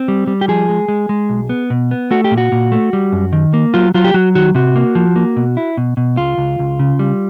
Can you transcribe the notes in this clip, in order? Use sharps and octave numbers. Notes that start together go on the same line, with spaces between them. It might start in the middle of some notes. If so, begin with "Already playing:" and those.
Already playing: C4
G3
G3
G4
F3 G#4
G#3
G#3
G#3
B1
B3
B2
B3
A3 F#4
G4
A#2
F#4
A#2
A3
G3
F#2
D#3
A#3
F#3 F4
F#3 F4
G4
F#3 F#4
D#3 F#4
C3 F#4
A#3
F3
A#3
B2
E4
B2
B2
C#2 F4
C#2
C#2
C#3
G3